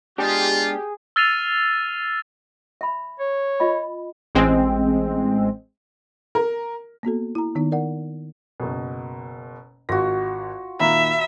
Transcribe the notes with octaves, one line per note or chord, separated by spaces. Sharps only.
G#3 B3 D4 F4 G4 G#4
E6 F6 A6 C7 D#7 F7
E5 B5
C#5
F4 D#5 B5
A1 G#3 C4
A#4
A#3 B3 F#4 A4
E4 A#5
D#3 B3 D#4
A#4 D5 F#5
F#1 B2
G#1 F4 F#4 A#6
A#2 D#3 A#3 E5 A#5 B5